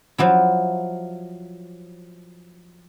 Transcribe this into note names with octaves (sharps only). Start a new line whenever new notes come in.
F3 F#3 E4